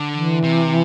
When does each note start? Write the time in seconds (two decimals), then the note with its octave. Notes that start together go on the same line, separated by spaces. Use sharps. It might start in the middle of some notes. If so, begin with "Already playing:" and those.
Already playing: D3
0.13 E3
0.44 C3